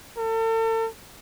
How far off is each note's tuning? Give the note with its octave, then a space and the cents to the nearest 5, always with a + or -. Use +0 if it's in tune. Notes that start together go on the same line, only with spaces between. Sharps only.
A4 +40